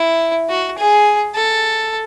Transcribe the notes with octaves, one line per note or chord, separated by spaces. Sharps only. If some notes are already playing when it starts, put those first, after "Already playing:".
Already playing: E4
F#4
G#4
A4